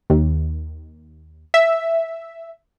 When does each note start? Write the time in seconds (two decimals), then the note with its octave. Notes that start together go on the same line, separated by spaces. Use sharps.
0.10 D#2
1.54 E5